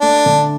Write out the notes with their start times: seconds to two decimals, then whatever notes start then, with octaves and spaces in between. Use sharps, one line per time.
0.01 A3 D4
0.26 D3